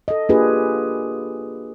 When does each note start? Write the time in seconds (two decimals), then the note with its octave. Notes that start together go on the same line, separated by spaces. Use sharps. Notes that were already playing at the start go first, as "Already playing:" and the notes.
0.08 A4 D#5
0.29 A#3 D4 F4 G4 G#4 B4